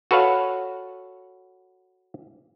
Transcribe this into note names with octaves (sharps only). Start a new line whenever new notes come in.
F#4 A4 B4 C#5 F5 F#5